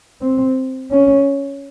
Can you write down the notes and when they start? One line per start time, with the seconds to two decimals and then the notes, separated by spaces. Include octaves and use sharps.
0.22 C4
0.91 C#4